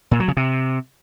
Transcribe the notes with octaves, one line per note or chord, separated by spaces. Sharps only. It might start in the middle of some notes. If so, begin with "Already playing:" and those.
A#2
F#3
C#3
C3